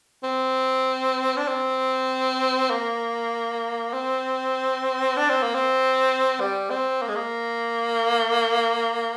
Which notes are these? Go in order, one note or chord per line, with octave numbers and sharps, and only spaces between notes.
C4
D4
C4
A#3
C4
D4
C4
A#3
C4
G3
C4
A#3
G#3
A#3